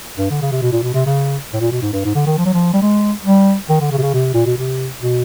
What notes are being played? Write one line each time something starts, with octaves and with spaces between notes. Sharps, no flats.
G2
D3
C#3
C3
B2
A#2
B2
C3
C#3
A2
A#2
B2
G#2
G2
G#2
D3
D#3
F3
F#3
F3
G3
G#3
G3
D#3
D3
C#3
C3
C#3
C3
A#2
B2
C3
B2